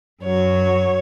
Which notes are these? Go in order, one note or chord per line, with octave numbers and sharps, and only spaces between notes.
F#2 F#3 C#5